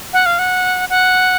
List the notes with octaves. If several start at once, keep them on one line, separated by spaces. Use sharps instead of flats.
F#5
F5
F#5
F#5